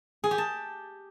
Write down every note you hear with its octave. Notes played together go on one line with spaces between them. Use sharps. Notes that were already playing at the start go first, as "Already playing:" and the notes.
G#4
G4
A5